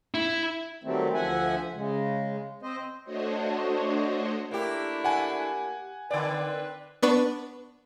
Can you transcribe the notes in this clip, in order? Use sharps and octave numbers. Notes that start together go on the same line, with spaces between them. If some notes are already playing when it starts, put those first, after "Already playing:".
E4
D#3 F#3 G3 A3 C4
D2 F3 E5 F#5 G#5
C#3 G#3
C4 C5 D#5
A3 D4 F#4 C5 C#5 D#5
A3 A#3 D4 E4 G4
F#5 G#5
D3 C4 B4 D5
B3 D4 B4 C#6